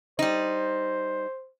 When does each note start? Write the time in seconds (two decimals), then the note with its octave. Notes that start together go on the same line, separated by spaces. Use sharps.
0.19 G3 D#4 C5